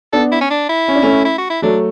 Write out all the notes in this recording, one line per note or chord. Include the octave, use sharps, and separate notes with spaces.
B3 D4 A4
E4
C#4
D4
E4
C#4
D4
A3 C#4
E4
F#4
E4
F#3 A3 D4